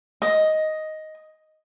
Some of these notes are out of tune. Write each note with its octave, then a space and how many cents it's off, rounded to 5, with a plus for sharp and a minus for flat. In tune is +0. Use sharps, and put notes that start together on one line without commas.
D#5 +5